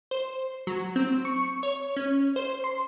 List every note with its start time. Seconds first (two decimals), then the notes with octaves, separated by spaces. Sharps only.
0.11 C5
0.67 F#3
0.96 C4
1.25 C#6
1.63 C#5
1.97 C#4
2.36 C5
2.64 C6